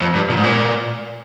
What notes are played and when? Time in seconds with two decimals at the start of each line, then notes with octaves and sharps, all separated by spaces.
0.01 F2
0.15 G2
0.29 A#2
0.37 G#2
0.44 A#2